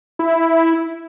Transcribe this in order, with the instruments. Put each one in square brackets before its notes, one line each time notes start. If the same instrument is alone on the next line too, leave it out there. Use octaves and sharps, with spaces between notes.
[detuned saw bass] E4